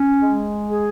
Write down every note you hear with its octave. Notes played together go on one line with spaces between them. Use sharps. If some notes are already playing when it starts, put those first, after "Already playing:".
Already playing: C#4
G#3
G#4